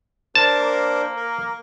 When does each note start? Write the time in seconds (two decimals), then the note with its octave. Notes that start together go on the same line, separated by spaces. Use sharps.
0.35 D4 A#4 C5 A5
0.60 A#3
1.16 A#4